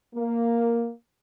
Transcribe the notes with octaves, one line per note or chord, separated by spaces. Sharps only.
A#3